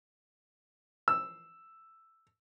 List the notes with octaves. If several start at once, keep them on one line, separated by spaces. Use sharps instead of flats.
E6